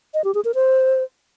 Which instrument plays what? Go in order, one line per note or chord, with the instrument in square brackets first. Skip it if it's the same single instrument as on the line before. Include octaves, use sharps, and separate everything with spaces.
[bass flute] D#5
G4
G#4
A#4
C5